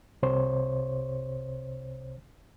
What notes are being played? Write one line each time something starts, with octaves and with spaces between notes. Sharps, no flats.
C2 C3 C5 C#5